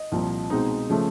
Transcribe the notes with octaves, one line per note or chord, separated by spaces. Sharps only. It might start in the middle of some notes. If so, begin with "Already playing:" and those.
Already playing: D#5
C2 A#2 F3
B2 G#3 C4 D#4
C#3 F3 A3